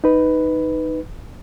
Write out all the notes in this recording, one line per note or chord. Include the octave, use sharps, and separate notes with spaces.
D#4 B4